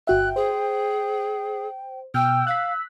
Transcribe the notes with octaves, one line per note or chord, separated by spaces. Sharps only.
G1 F#4 E5 G5 F#6
G#4 C5
B2 G5 E6 F6 G6
F5 F#6 B6